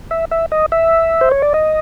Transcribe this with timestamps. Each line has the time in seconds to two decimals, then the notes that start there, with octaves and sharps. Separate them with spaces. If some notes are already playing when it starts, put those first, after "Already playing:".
0.11 E5
0.31 E5
0.52 D#5
0.72 E5
1.21 C5
1.31 C#5
1.42 D5
1.54 D#5